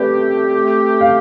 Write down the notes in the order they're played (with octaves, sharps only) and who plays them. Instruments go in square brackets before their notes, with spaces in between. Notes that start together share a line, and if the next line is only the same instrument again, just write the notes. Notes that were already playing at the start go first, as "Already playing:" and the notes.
Already playing: [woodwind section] A3 C4 G4 [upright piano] B4 D5 E5
[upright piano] F5